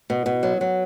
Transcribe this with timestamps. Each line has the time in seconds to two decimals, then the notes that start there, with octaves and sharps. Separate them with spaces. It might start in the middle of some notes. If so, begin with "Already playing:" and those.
0.10 B2
0.26 B2
0.43 F#3
0.61 F#3